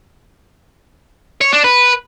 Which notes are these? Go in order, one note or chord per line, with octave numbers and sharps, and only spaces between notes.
C#5
D4
B4